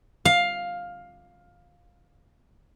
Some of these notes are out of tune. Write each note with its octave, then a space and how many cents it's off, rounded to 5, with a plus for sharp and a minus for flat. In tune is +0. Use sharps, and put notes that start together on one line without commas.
F5 +10